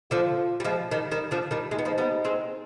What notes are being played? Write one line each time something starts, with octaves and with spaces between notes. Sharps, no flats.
D3 F3 F4
G3
F3 G#3
D#3 G3
D#3 G3
D3 F3
D#3 G3
G#3 D#4
B3
F3 G#3
G3 B3
G#3 C4